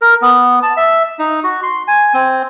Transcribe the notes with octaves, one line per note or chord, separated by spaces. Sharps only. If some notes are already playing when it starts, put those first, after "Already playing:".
A#4
B3
A5
E5
D#4
F#4
C6
G#5
C4